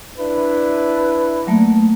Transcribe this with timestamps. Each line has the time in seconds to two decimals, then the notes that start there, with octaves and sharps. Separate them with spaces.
0.17 D4 E4 B4
1.47 F#3 A3 A#3